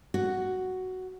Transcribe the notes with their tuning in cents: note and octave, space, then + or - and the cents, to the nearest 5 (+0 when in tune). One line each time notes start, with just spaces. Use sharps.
F#4 +5